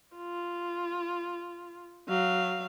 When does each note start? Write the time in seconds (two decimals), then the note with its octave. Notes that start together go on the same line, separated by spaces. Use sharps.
0.17 F4
2.08 F#3 F5